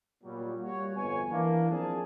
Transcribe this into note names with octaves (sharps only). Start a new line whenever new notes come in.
A#2 F#3 G3
G3 A#3 F#4 C#5
G1 F2 B2 B3 C#5 G#5
E3 A#3 D4
F3 A#3 C4 D4 G#4 A5